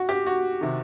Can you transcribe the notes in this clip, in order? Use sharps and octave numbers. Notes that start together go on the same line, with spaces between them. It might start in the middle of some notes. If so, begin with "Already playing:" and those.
Already playing: F#4
G4
F#4
C3 D#3